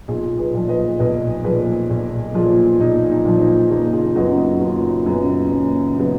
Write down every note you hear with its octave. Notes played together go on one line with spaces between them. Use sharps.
B1 F4 G#4
G#4 B4
A#2 F3
B4 D#5
B1 B4 D#5
A#2 F3 G#4 B4
B1
A#2 F3 F4 G#4
B1 D#4
D#4
A#2 F3
D#4
F#1 D#4
F4 G#4
F#2 C#3 F#3 B3 D#4 F#4
D#4 F#4
F#1 C#4 F4
F#2 C#3 F#3 B3
F#1 C#4
C#3 F#3 B3 D#4